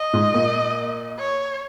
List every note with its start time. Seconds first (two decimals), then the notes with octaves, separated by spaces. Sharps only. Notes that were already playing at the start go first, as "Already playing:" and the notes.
Already playing: D#5
0.13 G#2
0.34 A#2
1.19 C#5